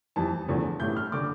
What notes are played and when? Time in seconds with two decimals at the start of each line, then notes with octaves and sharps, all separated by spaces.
0.16 F2 E3 G3 A5
0.48 E2 D3 F3 A3
0.80 A1 A2 G3 G6
0.97 F6
1.12 D3 G3 D6